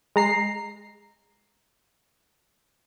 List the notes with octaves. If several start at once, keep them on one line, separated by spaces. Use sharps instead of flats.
G#3 A#5 C7